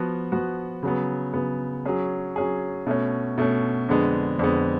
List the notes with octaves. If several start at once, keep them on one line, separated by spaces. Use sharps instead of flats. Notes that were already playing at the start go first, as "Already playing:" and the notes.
Already playing: F3 B3 F#4
F3 B3 F#4
C#3 F#3 B3
C#3 F#3 B3
F#3 C#4 G#4
F#3 C#4 G#4
B2 A3 C#4
B2 A3 C#4
F2 D3 G#3 B3
F2 D3 G#3 B3